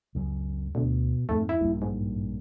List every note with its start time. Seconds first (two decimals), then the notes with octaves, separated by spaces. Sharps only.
0.15 C#2 F#2
0.75 D2 B2
1.29 F2 G#2 A3
1.49 E4
1.61 A#1 G2 A#2
1.82 G#2